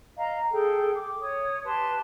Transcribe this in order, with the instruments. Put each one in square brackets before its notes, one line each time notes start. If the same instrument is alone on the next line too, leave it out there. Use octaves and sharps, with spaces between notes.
[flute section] D#5 F5 A#5
G#4 A4 G5
D6
C#5 D#6
G4 B4 A5 C6